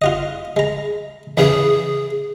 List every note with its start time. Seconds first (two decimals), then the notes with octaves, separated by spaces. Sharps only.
0.02 F4 F#4 D#5
0.56 G#3 A#5
1.37 E2 C#3 E3 G#4